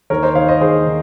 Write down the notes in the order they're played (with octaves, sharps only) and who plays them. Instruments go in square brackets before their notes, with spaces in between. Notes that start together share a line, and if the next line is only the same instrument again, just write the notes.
[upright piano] D#2 A#4 C#5
C5 D#5
D#3 C#5 F5
C5 D#5
D#2 G#4 C5
D#3